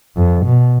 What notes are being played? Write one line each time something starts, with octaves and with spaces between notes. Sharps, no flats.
F2
B2